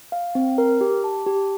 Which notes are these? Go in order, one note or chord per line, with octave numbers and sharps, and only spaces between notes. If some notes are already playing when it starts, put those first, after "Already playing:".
F5
C4
A#4
G4
A5
G4